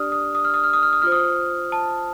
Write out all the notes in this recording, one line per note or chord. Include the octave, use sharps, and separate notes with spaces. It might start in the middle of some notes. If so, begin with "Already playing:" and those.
Already playing: D4 G4 D5 D#6 F6
D#6
D#6
F6
D#6
F6
D#6
F6
D#6
F4 C5 F6
D#6
A5